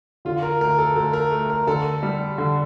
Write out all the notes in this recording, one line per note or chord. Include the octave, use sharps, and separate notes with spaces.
D3 F4
A#4
D2 A#4
A4
D2 A4
A#4
A3
A#4
D3 A4
G3
D3